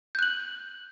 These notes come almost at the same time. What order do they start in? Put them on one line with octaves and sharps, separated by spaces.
G6 F#6 F#7